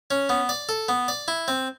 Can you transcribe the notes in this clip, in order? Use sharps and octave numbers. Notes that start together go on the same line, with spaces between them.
C#4
B3
D5
A4
B3
D5
E4
C4